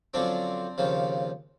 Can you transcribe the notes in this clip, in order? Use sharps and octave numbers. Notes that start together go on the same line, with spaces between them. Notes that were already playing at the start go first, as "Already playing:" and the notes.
F#2 D3 F3 C4 D4
D#2 C#3 F3